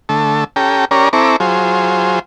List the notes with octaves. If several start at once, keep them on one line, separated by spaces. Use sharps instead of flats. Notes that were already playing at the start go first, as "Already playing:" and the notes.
D3 A3 A5
C#4 G4 A4 G5 A#5
C#4 G4 A#4 C#5 D5 A#5
C4 E4 A4 A#5 C#6 D6
F#3 F4 G#4 C5